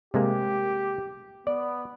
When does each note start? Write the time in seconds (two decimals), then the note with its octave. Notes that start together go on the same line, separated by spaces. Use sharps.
0.14 C3 G#3 A#3 G4
1.47 B3 D5